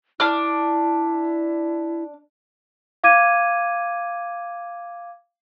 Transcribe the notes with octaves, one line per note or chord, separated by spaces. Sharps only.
D4 E4 D6 F6
F5 D6 G#6 D#7